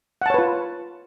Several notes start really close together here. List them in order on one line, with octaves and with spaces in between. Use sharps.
F#5 A5 C#5 B4 F4